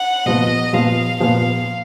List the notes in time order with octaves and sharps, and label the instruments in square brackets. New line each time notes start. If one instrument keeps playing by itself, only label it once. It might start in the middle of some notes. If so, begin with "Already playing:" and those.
Already playing: [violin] F#5
[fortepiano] A#2 F3 B3 [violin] D#5
[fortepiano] A#2 F3 B3 [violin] F5
[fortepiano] A#2 F3 B3 [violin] F5